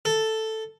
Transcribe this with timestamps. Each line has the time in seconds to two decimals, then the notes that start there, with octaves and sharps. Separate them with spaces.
0.05 A4